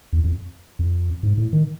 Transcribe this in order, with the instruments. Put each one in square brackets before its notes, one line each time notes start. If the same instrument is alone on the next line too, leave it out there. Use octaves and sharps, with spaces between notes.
[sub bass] E2
F2
F2
G#2
A2
D#3